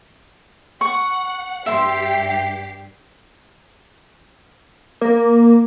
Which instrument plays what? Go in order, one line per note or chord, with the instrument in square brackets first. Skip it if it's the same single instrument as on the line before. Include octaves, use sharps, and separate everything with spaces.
[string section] F#5 [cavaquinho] C#6
[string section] G2 G4 C7 [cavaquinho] E5 C6
[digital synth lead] A#3